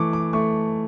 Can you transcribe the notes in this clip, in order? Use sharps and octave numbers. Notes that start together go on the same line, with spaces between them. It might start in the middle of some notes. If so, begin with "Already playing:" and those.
Already playing: E3 A3 C#6 D6
D6
A3 C#6